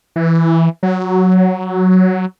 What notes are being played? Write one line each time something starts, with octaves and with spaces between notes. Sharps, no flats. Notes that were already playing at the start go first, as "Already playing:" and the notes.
E3
F#3